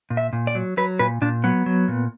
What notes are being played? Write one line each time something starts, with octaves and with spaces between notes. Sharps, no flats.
A#2
E5
A#2
D5
F#3
F#3 B4
A#2 B4
A#2 D4
F#3 B3
F#3
A#2